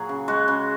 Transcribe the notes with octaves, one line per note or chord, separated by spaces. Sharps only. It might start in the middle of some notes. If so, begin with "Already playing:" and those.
Already playing: A#2 F#3 F#4 G#4
C#3
G#3 F#4
C#3